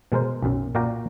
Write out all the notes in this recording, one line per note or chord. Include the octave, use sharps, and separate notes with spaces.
B2 G#3 A#4 C5
B1 F#2
A#2 F#4 D5 F5 G5 A#5